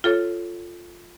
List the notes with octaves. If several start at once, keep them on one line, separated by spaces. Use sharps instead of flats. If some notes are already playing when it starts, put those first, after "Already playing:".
F4 A4 C#5